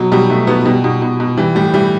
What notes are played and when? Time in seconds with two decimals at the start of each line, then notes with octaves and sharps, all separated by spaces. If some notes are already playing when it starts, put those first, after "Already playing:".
Already playing: B2 F#3
0.12 B2 G3
0.30 B2 A3
0.47 B2 B3
0.65 B2 G3
0.84 B2
1.02 B2
1.20 B2
1.37 E3 G3
1.55 A2 G3
1.74 E3 G3